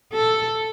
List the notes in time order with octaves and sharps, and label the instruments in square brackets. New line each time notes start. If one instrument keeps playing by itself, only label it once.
[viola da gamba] A4